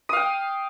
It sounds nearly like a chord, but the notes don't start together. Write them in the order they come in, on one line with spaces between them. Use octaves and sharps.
D#6 F5 G5